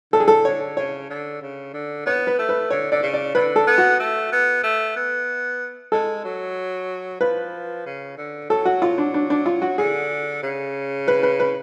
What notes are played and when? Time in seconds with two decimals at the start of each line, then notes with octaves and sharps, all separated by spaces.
0.13 D3 A4
0.20 G#4
0.28 A4
0.45 D3 C#5
0.77 C#3 C#5
1.10 D3
1.42 C#3
1.74 D3
2.06 B3 C#5
2.27 B4
2.39 A3
2.49 B4
2.70 D3 C#5
2.91 D3 D5
3.02 C#3
3.14 D5
3.35 D3 B4
3.56 A4
3.67 B3
3.78 F#4
4.00 A3
4.32 B3
4.63 A3
4.96 B3
5.92 G#3 A4
6.24 F#3
7.20 F3 B4
7.86 C#3
8.17 D3
8.50 F#3 A4
8.65 F#4
8.82 F4
8.98 D4
9.14 D4
9.30 D4
9.46 F4
9.62 F#4
9.78 D3 G#4
10.43 C#3
11.08 B4
11.23 B4
11.40 B4